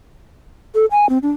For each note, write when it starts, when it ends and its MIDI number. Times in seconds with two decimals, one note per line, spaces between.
0.75 0.85 69
0.91 1.08 80
1.09 1.18 60
1.23 1.30 62